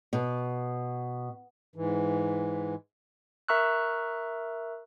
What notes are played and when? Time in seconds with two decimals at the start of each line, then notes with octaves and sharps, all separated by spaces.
0.13 B2
1.76 G#2 E3
3.48 A#4 E5 A#5 C#6 E6 F#6